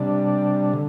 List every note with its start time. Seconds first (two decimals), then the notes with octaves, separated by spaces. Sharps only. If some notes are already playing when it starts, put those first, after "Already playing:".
Already playing: C3 G3 D4
0.74 D3